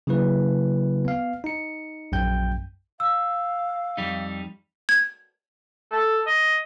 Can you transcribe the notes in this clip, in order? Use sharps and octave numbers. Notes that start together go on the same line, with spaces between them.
C#3 F#3 A#3 E4 B4
B3 F5
D#4 C#7
A#1 F#2 G5 G6
F5 E6
F2 G3 D#4
G#6
A4
D#5